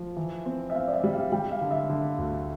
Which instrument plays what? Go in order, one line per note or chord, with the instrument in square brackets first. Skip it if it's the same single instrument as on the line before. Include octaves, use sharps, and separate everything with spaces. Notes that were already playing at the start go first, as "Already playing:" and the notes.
Already playing: [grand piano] F3
E3
C4
[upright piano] E5
[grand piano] C4 [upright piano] F5
[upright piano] D5
E5
[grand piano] G3
[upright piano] F5
[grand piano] G3 [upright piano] G5
[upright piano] F5
[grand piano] D3
[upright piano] E5
[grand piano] D3
D2